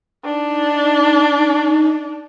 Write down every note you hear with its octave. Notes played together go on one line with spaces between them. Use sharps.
D4 D#4